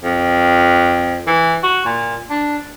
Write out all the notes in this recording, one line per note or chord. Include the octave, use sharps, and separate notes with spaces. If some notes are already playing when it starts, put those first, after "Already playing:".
F2
E3
F#4
A#2
D4